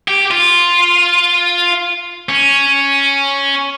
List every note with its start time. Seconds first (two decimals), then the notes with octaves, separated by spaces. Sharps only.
0.08 G4
0.31 F4
2.29 C#4